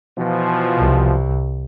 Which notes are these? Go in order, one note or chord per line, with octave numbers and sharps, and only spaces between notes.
B2 E3 F3
C2